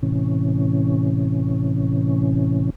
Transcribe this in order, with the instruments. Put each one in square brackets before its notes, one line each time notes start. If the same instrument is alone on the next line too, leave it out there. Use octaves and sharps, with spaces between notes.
[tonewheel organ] A2 C3 E3 C#4